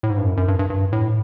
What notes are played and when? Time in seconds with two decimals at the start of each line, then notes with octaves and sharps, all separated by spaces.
0.03 A2
0.10 G#2
0.17 G2
0.25 F#2
0.37 F#2
0.48 G2
0.59 G2
0.70 G2
0.92 A2